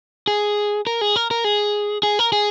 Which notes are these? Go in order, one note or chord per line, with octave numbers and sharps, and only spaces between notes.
G#4
A#4
G#4
A#4
A#4
G#4
G#4
A#4
G#4